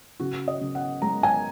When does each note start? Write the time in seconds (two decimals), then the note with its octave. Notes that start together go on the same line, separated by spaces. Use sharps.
0.20 C#3 F#4
0.48 D#5
0.61 C#3
0.75 F#5
1.02 G#3 A#5
1.23 G#5